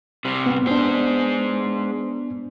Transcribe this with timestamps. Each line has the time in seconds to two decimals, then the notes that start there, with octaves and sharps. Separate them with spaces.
0.25 C3 G3
0.46 B3 C4
0.67 G#3 B3 D4 C5